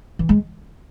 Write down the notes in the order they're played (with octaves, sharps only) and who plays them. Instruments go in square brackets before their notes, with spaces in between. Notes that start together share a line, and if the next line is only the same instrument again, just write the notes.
[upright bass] E3
G#3